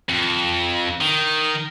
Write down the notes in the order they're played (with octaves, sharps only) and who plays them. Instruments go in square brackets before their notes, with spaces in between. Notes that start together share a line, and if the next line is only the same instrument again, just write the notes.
[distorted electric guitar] F2
D#3